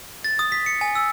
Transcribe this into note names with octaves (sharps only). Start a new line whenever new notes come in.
A6
D#6
B6
C#7
G#5
E6